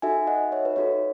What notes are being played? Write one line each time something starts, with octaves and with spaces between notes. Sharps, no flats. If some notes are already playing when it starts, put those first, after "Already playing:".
D#4 F#4 A4 E5 G#5
D#5 F#5
C#5 E5
B4
D#4 F#4 A4 C#5